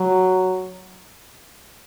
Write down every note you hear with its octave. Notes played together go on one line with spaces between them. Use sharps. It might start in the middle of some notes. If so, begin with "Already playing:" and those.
Already playing: F#3